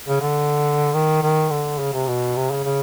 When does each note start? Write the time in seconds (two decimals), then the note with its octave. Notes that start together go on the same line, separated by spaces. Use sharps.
0.08 C#3
0.21 D3
0.94 D#3
1.22 D#3
1.50 D3
1.79 C#3
1.93 C3
2.07 B2
2.36 C3
2.51 C#3
2.64 C#3